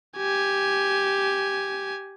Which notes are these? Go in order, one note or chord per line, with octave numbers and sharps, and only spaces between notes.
G4 G#5